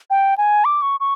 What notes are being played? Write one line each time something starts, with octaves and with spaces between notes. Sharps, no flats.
G5
G#5
D6
C#6
C#6